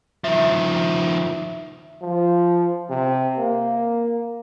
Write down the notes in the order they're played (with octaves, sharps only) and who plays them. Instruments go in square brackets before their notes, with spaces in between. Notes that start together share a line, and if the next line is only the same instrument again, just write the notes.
[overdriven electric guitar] D#3 F3 [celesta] E5
[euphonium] F3
C3
A#3